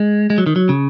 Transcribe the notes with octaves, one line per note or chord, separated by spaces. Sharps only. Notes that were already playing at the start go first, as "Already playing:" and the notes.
Already playing: G#3
G#3
F#3
D#3
F#3
C#3